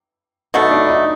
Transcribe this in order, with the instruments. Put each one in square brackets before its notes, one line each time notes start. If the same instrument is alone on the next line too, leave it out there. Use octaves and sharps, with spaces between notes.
[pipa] B2 F#3 A3 [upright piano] D#4
[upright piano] D4
D#4